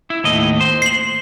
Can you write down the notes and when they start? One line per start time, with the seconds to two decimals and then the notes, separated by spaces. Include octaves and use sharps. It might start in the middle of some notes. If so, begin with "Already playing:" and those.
0.10 E4
0.24 D#2 A2 D#5
0.61 C5
0.82 C7 F#7